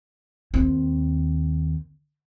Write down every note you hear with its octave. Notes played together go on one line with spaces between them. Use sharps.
D#2 C4